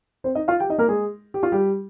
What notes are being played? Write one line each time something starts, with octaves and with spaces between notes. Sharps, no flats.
C4 C5
D#4 D#5
F4 F5
G4 G5
D#4 D#5
A#3 A#4
G#3 G#4
G4
F4
G3 G4